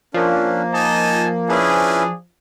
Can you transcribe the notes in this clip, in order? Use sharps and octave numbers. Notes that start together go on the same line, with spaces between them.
F3 A#3 C#4 D4
D#4 D#5 G#5 A5
C#4 D4 E4 G#4 B4